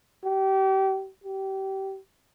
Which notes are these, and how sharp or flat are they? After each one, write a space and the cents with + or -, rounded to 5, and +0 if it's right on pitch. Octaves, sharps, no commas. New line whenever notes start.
G4 -30
G4 -25